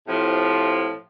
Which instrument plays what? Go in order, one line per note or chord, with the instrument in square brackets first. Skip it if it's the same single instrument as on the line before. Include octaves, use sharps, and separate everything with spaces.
[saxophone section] A2 C3 F3